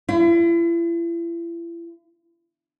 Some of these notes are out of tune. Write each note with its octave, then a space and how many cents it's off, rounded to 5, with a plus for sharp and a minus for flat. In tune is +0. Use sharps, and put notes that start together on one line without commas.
E4 +40